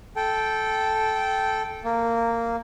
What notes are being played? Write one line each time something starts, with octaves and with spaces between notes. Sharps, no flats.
A4 G5
A#3